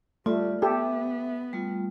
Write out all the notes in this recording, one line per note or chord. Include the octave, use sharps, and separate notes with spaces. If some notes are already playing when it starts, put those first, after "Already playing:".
G3 A3 F4 D5
B3 G4 A4 E5
G3 A3 F4